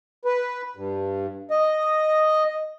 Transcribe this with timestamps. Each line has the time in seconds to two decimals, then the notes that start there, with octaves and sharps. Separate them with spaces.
0.25 B4
0.76 G2
1.50 D#5